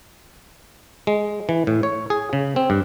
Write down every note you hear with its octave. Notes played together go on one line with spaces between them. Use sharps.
G#3
E3
A2
C#5
G#4
C#3
C4
G2